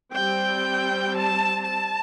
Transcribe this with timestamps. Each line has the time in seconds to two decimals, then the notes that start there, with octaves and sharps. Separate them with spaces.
0.15 G3 C4 G5
1.16 A5
1.66 A5